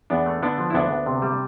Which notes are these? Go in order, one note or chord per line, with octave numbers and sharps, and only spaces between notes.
E2 B3 D4
A3
D3 B3 D4
F3
E4
D2 B3 D4
D2
C3
G3